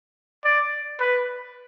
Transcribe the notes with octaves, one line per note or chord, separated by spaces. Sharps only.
D5
B4